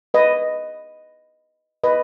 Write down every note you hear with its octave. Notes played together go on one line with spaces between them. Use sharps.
B4 D#5
B4 D#5